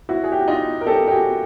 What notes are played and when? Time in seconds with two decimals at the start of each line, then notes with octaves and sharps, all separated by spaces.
0.09 E4 F#4
0.24 G#4
0.32 G4
0.40 F#4
0.48 D#4 F4
0.81 A#4
0.87 G4 A4
1.08 G4
1.12 F#4 G#4